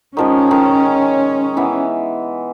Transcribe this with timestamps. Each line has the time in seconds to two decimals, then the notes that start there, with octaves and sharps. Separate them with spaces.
0.17 D#3 F3 G#3 C#4
0.51 D#3
1.57 E3 B3